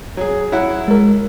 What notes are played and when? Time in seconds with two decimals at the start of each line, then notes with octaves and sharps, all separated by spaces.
0.17 F#3 G#4
0.52 F#3 E4 F#5
0.88 G#3 A#4